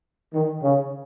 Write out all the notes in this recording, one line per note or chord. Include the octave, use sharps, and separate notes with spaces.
D#3
C#3